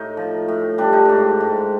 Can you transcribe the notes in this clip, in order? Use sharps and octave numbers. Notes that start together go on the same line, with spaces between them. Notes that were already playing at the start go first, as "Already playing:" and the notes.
Already playing: A2 D#4
F3
A2
G3 D4
D#4
G#2 D4
G#2